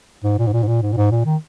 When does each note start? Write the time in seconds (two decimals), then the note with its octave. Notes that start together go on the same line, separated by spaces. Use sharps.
0.24 G#2
0.39 A#2
0.47 G#2
0.53 A#2
0.63 G#2
0.68 A#2
0.82 G#2
0.93 A#2
0.97 G#2
1.11 A#2
1.26 D#3